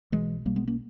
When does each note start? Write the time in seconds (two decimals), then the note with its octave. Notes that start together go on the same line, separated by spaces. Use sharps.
0.12 B1 B2 E3 G#3
0.45 B1 B2 G3 A#3
0.56 G#3 B3
0.68 A#3 C#4